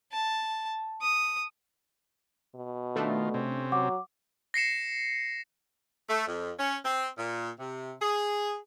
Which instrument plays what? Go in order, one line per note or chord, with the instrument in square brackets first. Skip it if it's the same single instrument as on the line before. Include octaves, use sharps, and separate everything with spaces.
[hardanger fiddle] A5
D#6
[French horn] B2
[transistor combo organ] D#3 F4 [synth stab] A3 D4
[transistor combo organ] C3 C4 C#4
[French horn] F#3 [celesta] F#5 D6
[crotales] A#6 C7 C#7 E7
[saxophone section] A3
F2
C#4
C4
A#2
C3
G#4